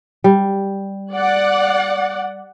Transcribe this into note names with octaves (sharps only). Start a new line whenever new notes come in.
G3
D5 F#5